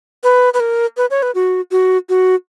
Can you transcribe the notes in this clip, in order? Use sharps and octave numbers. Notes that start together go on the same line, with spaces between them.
B4
B4
A#4
B4
C#5
B4
F#4
F#4
F#4